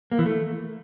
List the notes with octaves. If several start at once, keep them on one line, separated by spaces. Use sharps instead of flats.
A#3
E3
A3